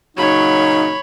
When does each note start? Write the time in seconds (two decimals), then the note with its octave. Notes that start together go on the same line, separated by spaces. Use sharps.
0.17 A#2 C#3 F#3 D#4 C#5 B5